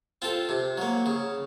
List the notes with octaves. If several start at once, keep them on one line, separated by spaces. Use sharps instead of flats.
C4 F4 A4
C3
F#3 A#3
C#3